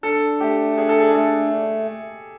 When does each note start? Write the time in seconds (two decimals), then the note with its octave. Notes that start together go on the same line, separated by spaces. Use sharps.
0.03 D4 A4
0.41 A3 G4
0.77 D4 G#4
0.89 A4
1.00 G#4
1.15 A3 A4